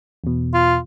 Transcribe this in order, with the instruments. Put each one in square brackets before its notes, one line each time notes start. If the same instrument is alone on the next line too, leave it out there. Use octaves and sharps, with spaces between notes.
[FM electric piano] E2 B2
[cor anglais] F4